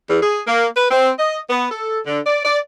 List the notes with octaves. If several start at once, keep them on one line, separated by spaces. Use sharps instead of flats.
E2
G#4
A#3
B4
C4
D#5
B3
A4
D3
D5
D5